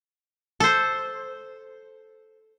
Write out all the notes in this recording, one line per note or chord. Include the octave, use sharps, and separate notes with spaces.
A4 C5